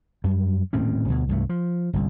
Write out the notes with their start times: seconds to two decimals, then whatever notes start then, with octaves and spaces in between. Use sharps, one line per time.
0.24 F#2 G3
0.73 D#1 A2 C4 C#4
1.08 D2 B2
1.29 C2 G2 A3
1.49 F3
1.93 G1 C2